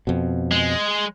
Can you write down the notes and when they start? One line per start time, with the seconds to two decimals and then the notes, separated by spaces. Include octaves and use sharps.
0.07 F2 B2
0.51 G#3